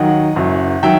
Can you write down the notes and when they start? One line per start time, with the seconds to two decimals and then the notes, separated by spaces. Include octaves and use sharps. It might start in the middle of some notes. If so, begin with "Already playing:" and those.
Already playing: D#2 D#3 F#3 D#5 F#5
0.36 F#1 F#2 F#3
0.83 D#3 F#3 E5 G5